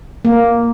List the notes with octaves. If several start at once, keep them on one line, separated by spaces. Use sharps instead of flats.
A#3